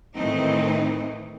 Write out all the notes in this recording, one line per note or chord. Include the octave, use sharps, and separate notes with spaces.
A2 D#3 E3 A3 C4 D#4